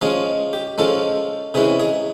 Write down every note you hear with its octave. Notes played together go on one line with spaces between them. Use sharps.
F3 G#3 C#4 F4 G#4
G4
F3 G#3 C#4 F4 A4
C3 E3 G#3 C#4 G#4
G#4